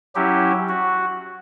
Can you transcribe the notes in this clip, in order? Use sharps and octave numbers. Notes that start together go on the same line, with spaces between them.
F#3 C#4 E4 G4
F#4